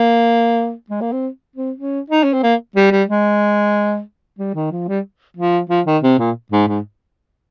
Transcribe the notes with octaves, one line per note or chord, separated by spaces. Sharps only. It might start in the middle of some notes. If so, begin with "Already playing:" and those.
Already playing: A#3
G#3
A#3
C4
C4
C#4
D#4
C#4
C4
A#3
G3
G3
G#3
G3
D#3
F3
G3
F3
F3
D#3
C3
A#2
G#2
G#2